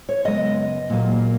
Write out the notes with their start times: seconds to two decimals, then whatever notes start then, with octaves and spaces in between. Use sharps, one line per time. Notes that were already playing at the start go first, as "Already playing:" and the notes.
0.09 C#5
0.25 F#2 C#3 G#3 B3 D#5
0.90 A#2 F#3 A#3